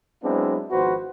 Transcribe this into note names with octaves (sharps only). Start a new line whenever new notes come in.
F#3 G#3 B3 C4 D4 E4
G#1 F3 B3 F#4 B4 C5